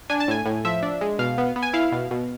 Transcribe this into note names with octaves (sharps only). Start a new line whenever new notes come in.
D4 G#5
A5
A2 G#5
A2
F3 E5
D4
G#3
B2 F5
B3
B3
G#5
E4 F5
B2
B2